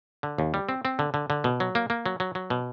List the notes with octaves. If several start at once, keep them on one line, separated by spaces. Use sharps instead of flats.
D3
D#2
G3
C4
C4
D3
D3
D3
B2
F#3
A#3
A#3
F#3
F#3
F#3
B2